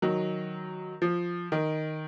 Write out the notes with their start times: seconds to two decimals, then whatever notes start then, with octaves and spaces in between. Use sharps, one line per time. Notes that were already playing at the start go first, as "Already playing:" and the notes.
0.02 D#3 F#3
1.02 F3
1.52 D#3